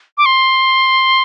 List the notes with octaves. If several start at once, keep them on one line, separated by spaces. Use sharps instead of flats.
D6
C6